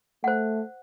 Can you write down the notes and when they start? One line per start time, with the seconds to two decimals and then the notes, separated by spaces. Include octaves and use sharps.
0.24 A3 C5 F#5